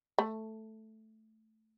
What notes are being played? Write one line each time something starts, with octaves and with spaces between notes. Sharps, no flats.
A3